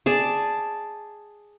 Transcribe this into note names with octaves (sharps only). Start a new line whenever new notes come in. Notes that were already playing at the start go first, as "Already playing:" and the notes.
G#4 D5 A5